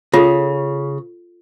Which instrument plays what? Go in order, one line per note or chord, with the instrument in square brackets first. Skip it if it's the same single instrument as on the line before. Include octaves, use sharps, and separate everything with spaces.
[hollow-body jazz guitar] C#3 [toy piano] F4 A4